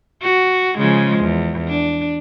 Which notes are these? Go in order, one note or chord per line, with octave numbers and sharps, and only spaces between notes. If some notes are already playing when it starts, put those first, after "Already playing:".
F#4
C#3 F3 G#3
E2
D4